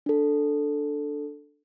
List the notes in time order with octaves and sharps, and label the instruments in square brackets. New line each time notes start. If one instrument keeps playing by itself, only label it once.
[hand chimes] D4 A4